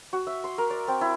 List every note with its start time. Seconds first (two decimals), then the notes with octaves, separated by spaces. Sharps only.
0.13 F#4
0.27 E5
0.44 C6
0.58 A#4
0.70 D5
0.88 C4
1.01 E4